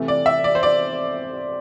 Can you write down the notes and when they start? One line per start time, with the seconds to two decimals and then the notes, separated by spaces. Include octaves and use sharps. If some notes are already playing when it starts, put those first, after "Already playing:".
Already playing: C3 E3 A3
0.08 D5
0.26 E5
0.44 D5
0.55 C5
0.63 D5